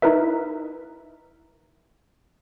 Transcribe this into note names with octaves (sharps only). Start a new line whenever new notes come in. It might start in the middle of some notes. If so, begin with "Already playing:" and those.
D#4 E4 A#4 B4 E5